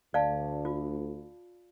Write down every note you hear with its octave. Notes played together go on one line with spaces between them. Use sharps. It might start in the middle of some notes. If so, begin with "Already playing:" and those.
D2 D5 F5 A5
F4